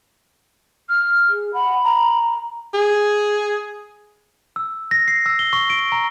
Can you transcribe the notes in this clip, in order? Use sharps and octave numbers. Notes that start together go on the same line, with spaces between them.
F6
G#4
F#5 B5
A#5
G#4
E6
A#6
C7
E6
G7
C#6
D7
A#5